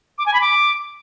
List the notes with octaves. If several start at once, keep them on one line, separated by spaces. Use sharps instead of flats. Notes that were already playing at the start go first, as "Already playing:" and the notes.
D6
G#5
B5
D6